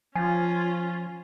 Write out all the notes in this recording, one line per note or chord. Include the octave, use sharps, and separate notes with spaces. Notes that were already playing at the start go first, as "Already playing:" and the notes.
F3 C#4 F4 G#5